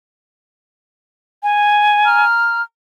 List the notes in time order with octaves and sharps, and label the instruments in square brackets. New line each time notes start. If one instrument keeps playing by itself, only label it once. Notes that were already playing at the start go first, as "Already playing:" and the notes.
[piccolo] G#5
[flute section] A#5 F6